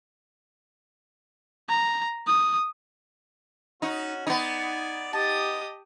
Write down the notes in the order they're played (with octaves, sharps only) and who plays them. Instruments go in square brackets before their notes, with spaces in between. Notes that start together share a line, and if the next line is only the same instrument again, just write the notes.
[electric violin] A#5
D#6
[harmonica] C#4 F#4 [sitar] D#4
[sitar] B3 D#4 [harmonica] D5 G#5
[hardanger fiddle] G4 D#6 [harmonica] D#5 [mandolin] A5